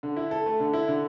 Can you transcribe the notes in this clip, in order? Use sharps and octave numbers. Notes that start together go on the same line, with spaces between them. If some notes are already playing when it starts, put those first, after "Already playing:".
D3
E4
A4
A3
D3
E4
D3